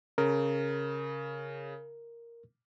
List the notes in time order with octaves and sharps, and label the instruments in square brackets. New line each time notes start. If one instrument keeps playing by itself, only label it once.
[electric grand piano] C#3 [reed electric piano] A#4